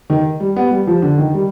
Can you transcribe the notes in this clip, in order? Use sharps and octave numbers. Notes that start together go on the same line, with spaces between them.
D#3
G3
B3
G3
F3
D3
D#3
G3